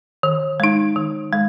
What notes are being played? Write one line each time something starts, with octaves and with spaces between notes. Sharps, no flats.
D#3
G#3 D#4
D#3
G#3